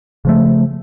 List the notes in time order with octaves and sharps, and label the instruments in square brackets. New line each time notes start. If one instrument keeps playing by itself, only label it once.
[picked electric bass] C#3 F3 A3